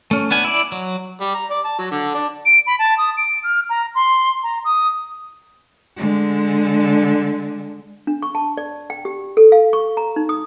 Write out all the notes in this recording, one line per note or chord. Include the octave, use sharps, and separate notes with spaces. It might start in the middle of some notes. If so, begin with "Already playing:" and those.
A3 C#4
B3 D4 G#5
E4 D5
F#3
G3
A#5
D5
A5
F#3
D3
D4
D7
B5
A5
D#6
D7
F6
A#5
C6
A#5
D#6
D3 G#3
D4
C#6
A5
D5
G5
G4
A4
F5
C#6
A#5
D#4
D#6